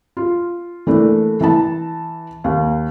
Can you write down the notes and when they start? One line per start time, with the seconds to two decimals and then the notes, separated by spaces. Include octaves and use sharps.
0.17 F4
0.87 E3 A3 A#3 D4
1.41 E3 A5
2.44 D#2